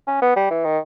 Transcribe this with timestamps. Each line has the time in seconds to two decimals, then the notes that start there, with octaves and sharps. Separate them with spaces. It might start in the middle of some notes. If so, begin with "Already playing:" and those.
0.07 C#4
0.22 B3
0.36 G3
0.50 E3
0.65 D#3